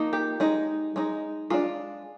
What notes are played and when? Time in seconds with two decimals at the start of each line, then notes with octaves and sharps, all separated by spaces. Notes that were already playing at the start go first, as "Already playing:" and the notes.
Already playing: F3 A#3 D#4
0.13 G4
0.40 G#3 D#4
0.96 G#3 D#4
1.50 G#3 D4 F4